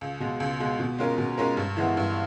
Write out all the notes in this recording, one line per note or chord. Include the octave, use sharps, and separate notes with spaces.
C#2
B2 G#3
C#2
B2 G#3
B2
G#3 C#4 F4 A#4
B2
G#3 C#4 F4 A#4
G2
E3 G#3 B3
G2